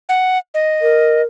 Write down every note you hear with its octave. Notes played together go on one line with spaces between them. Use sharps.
F#5
D#5
A#4